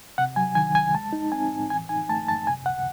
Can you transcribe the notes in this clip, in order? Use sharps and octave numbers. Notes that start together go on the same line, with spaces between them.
C3 F#5
F#3 G#5
D#3 G#5
C2 G#5
G#3 A5
D#4
C4 G#5
A2
E3 G#5
D#4 G#5
A3 A5
F#2 A5
C3 G#5
C#2 F#5